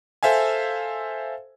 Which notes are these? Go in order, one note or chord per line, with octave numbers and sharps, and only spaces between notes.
A4 C5 E5 F5 G#5